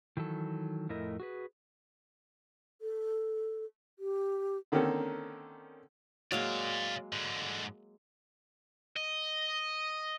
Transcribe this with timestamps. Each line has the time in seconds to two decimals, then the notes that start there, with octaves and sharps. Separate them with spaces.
0.17 D#3 E3 F#3 A4
0.89 F2 A2 A3 E4 A#4 D#5
1.20 F#4 G#4 B4
2.81 A4
3.99 G4
4.72 D3 D#3 A#3 C4 C#4 A4
6.32 F#3 G#3 A#3 D5 F5
7.13 G#2 D3
8.96 D#5